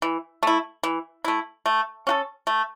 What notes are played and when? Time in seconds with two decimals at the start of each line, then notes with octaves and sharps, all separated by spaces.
0.02 E3
0.43 A3 E4
0.83 E3
1.24 A3 E4
1.66 A3
2.07 C#4 F#4 A4
2.47 A3